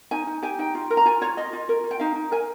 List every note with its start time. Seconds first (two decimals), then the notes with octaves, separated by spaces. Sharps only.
0.11 D#4 G#5
0.27 D#4
0.42 G4 G#5
0.59 D#4 G5
0.75 F4
0.90 A#4
0.97 A#5
1.05 F4 G#5
1.21 F4 C#5
1.37 F4 D#5
1.53 F4
1.69 A#4
1.84 F4
1.91 G5
2.00 D#4 F5
2.16 D#4
2.31 A#4 G#5